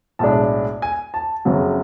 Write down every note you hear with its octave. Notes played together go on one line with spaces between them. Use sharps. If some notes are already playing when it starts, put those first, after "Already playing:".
B1 A2 G#3 D4 A5
G#5
A5
F#1 F2 C#3 F#3